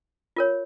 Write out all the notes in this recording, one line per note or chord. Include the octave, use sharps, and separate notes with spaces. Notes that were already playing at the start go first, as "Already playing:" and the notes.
F4 A#4 C#5